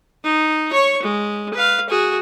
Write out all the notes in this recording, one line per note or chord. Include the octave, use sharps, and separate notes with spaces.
D#4
C#5 C#6
G#3
B4 F5
F#4 G#4